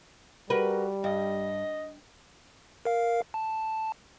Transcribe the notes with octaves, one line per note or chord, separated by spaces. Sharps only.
G3 F#4 A#4 B4
G2 D#5
A#4 F5
A5